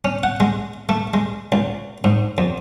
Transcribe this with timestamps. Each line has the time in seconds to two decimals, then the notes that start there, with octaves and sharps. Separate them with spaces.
0.05 C#4
0.23 F#5
0.40 G#3
0.89 A3
1.14 G#3
1.52 C#2
2.04 G#2
2.38 F2